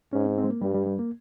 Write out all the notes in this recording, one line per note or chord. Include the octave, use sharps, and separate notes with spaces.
G#2 C#4
C4
C4
G#3
A#3
G2 G3
G3
G3
A#3